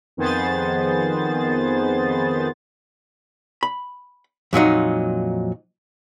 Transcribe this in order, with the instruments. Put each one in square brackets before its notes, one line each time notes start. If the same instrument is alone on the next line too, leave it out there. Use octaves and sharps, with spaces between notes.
[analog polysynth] F2 D#3 B3 G#4 C5 A6
[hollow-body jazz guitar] B5
F2 A#2 F#3 D#4